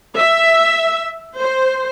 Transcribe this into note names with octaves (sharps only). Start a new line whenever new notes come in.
E5
C5